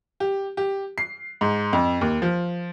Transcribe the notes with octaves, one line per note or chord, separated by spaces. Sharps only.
G4
G4
C7
G#2
F2
D#2
F3